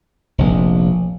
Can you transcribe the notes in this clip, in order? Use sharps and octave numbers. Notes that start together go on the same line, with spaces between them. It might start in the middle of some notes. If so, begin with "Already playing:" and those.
F1 A#1